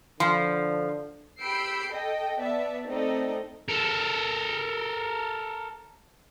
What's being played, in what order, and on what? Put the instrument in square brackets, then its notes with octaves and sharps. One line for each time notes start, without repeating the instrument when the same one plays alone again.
[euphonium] D3 [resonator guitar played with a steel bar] F3
[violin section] G4 B5 E6 G6 C7 D7
A4 D#5 G5
B3 D5 E5 A5
A3 C4 D#4 A4 D5 D#5
[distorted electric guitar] A4 A#4